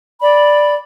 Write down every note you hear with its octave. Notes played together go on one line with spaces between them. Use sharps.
D5 B5